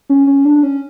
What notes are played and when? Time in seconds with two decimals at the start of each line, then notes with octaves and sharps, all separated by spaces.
0.10 C#4
0.27 C#4
0.45 D4
0.63 C#4